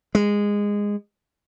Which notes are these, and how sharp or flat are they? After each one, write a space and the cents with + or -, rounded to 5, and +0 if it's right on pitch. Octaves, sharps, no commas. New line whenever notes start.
G#3 -15